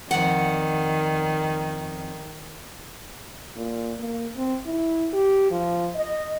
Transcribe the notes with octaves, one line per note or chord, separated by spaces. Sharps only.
F2 D#3 D5 F#5
A#2
A#3
C4
E4
G4
F3
D#5